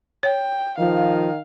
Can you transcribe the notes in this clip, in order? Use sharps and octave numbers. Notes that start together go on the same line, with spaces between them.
C#5 G5
D#3 F3 F5